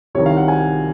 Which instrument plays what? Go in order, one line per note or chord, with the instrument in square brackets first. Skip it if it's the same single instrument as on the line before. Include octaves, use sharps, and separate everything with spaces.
[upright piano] C2 C3 D#3 C#5
F5
F#5
G#5